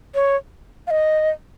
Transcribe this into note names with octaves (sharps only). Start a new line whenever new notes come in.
C#5
F5
D#5